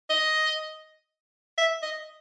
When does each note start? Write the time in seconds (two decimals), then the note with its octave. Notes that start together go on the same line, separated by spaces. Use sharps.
0.10 D#5
1.58 E5
1.82 D#5